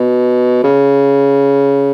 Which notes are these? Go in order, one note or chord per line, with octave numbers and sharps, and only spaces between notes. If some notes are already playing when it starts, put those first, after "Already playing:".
Already playing: B2
C#3